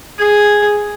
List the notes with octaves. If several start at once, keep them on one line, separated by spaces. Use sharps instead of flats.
G#4